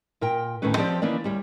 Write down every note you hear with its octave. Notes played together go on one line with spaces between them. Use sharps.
A#2 A#4 G5
D2 A2 D#3 A3 C#4 B4
F3 C4 G4 C5 D5
D#3 E3 A#3 C#4 D5
D2 G3 C#5